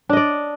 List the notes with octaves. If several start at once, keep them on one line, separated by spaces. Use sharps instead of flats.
D4 D5 D#5